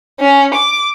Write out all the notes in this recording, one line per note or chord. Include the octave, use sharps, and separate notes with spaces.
C#4
D6